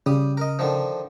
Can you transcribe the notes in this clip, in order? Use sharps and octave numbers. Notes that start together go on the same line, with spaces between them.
C#3 G3 D#6
A#4 D#5
D3 D#3 F3